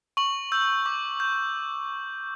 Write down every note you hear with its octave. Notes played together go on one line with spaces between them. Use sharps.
C#6 F#7
E6 G6
D6
G6